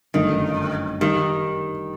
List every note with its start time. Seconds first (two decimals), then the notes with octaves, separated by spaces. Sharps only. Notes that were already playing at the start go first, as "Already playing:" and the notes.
0.14 G1 F#2 D3 D#3 A3 D#4
1.01 D#3 G3